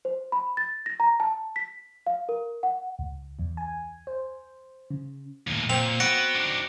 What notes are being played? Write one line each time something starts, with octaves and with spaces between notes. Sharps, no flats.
C5
B5
A6
A#6
A#5
A5
B6
F5
A#4
F#5
C#2
E2
G#5
C5
C#3
D#2 A2
A#2 C4 F7
B3 F#4 B4 A#6 C#7 D7
D4 D#4